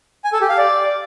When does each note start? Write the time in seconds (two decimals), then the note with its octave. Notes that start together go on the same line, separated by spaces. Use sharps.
0.24 G#5
0.33 A4
0.41 G4
0.49 F5
0.58 D5